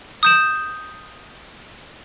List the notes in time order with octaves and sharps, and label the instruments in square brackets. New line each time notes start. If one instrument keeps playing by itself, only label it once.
[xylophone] D#6 G6 E7